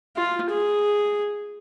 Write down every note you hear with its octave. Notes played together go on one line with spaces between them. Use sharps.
F4
G#4